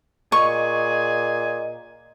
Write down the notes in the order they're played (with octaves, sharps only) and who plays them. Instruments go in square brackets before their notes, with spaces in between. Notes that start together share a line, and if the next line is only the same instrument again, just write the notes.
[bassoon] A#2 [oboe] G#4 [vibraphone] D#5 [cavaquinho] C#6